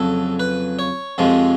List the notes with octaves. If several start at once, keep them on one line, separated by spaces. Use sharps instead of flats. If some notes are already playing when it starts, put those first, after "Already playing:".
Already playing: F2 C#3 F#3 A4
B4
C#5
F2 C3 F3 G#3